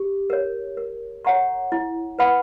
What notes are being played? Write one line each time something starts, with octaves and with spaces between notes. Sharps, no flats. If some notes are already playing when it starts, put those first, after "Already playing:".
Already playing: G4
A#4 C#5
A#4
C#5 F#5 A#5 C#6
E4
B4 F#5 B5